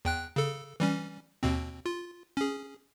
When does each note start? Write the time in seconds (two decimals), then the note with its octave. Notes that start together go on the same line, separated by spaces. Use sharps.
0.05 E2 G5 F#6
0.36 C#3 A4
0.80 E3 G3 C#4
1.43 D#2 B2 C4
1.86 F4
2.37 C#4 G#4